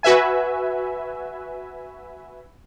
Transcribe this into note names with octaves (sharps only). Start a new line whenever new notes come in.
F#4 B4 E5 G#5